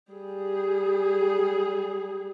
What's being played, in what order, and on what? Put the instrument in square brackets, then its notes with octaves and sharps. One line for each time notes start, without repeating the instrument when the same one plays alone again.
[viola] G3 G#4